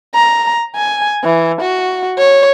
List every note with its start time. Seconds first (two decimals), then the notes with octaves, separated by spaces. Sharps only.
0.15 A#5
0.76 G#5
1.24 E3
1.62 F#4
2.19 C#5